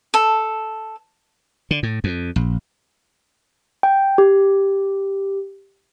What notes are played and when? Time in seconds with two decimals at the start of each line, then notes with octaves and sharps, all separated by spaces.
0.14 A4
1.71 D3
1.83 A2
2.04 F2
2.36 A#1
3.83 G5
4.18 G4